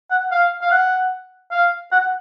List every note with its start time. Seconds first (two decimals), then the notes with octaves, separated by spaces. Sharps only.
0.11 F#5
0.31 F5
0.62 F5
0.71 F#5
1.51 F5
1.92 F#5